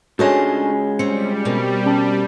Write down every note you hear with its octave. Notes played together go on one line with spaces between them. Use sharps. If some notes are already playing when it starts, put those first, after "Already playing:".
C#2 G#3 A3 D4 F#4 C#5 D#5 G#5
G3 C4 C#4 C#7
B2 A#3 C4
C#4 A5